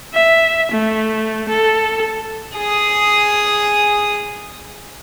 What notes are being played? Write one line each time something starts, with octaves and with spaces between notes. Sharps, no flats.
E5
A3
A4
G#4 D#6